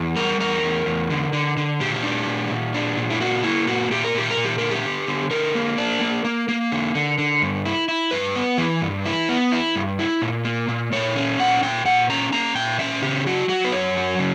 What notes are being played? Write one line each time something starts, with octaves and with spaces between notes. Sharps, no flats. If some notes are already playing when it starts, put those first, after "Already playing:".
Already playing: E2
G3 A#4
E2 A#4
E2
E2
D3
D3
D3
A#2 G4
D4
A#2
A#2
D4
A#2
E4
A#3 F#4
A#3 E4
A#2 F#4
A#2 G4
A#4
A#2 G4
A#4
A#2
G4
D3 A#4
G4
D3
D3
D3 A#4
A#3
D4
A#3
A#3
A#3
D3
D3
D3
G2
E4
E4
G2 B4
B3
E3
G2
E4
B3
E4
G2
E4
A#2
A#3
A#2
A#2 C#5
C#4
A#2 F#5
A#2 G5
A#2 F#5
C#4 A#5
A#3 A#5
A#2 G5
C#4 E5
C#3 G4
F#3 F#4
F#3 F#4
B4
F#2 C#5
F#3
C#3